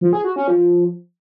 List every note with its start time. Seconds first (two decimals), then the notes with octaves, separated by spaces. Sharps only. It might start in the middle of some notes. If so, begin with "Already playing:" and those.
0.01 F3
0.13 G#4
0.24 F#4
0.36 C#4
0.48 F3